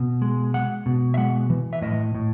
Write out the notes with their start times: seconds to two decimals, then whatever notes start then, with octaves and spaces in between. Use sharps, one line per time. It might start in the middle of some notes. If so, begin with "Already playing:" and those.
Already playing: B2
0.22 G#3
0.54 G#3 F#5
0.86 B2
1.14 E5
1.18 G#3 F#5
1.50 E3
1.73 E5
1.82 A2 D#5
2.15 A2